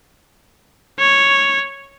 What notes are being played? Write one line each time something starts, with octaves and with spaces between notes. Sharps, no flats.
C#5